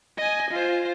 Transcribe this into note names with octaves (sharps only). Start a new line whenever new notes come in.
D#5 G#5
F4 C5